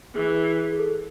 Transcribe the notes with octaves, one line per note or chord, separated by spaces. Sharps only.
E3 G#4
G#4
A4